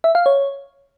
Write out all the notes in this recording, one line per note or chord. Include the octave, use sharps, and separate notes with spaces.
E5
F5
C#5